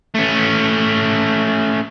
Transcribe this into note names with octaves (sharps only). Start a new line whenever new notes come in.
A3 C#4